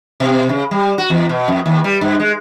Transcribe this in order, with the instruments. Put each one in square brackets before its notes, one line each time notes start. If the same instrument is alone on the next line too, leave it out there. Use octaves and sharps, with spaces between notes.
[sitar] B2
C#3
G3
F#4
E2
B2
F2
D#2
G3
G2
G#3